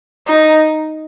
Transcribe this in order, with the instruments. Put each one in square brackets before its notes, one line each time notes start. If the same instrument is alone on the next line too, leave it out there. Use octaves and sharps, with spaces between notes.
[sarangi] D#4